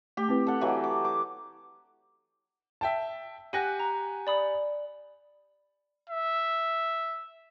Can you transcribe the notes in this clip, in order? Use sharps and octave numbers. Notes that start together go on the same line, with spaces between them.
A3 G4
C4 E4 B4
A4 F#5
E3 F#3 G4 B4 D#5 F5
D6
D6
E5 G5 A5
G4 F#5 G#5 F#6 A#6 D#7
A#5
D5 B5 D#6
E5